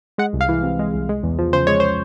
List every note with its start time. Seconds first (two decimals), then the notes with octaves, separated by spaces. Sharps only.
0.18 G#3 F#5
0.33 C2
0.41 F5
0.49 E3
0.63 C3
0.79 G#3
0.94 C2
1.09 G#3
1.23 E2
1.39 F3
1.53 C#3 C5
1.67 G#3 C#5
1.80 C5